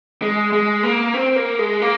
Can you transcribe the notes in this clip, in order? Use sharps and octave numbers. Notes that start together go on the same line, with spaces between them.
G#3
G#3
A#3
C4
A#3
G#3
A#3